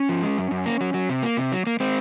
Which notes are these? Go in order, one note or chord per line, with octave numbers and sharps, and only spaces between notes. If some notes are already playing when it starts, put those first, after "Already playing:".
Already playing: C#4
F3
G#3
F#2
F#2
A#3
F#3
F#3
C3
A#3
C3
F#3
A#3
G#3 C4